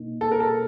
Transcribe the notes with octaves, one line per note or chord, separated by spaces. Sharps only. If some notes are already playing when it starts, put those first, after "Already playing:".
Already playing: B2 A#3 D#4
A4
A#4
A4